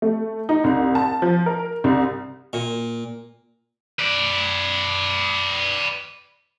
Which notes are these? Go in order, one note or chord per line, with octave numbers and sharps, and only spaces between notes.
A3
D#4
C2
A5
F3
A#4
C2
A#2
B4 D5